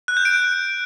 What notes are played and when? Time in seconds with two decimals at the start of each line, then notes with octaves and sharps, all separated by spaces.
0.08 F#6
0.17 G6
0.25 D7